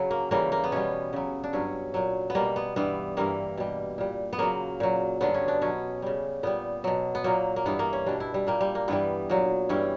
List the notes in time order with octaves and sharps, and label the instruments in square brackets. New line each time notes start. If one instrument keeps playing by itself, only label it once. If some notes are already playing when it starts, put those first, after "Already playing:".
Already playing: [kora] C#3 F#3 C#4
A#3
C#3 E3 G3 A#3
A#3
B3
B2 G3 C#4
C#3 F#3
D4
G2 F#3 C#4
A#2 F#3
B3
B2 G3 A#3
B3
G2 E3 G3 B3
G2 E3 G3 A#3
B2 G3
A#2 G3
B3
C#3 F#3 A#3
A#2 F#3
G2 D3 F#3 B3
C#4
D4
B2 F#3 C#4
C#3 G3
A#2 G3 B3
B2 F#3
B3
A#2 F#3 A#3
A#3
G2 E3 G3 B3
A#3
C#4
B2 G3 D4
E4
G3
A#2 G3 A#3
G3
A#3
G2 E3 G3 B3
A#2 F#3
G2 E3 G3 C#4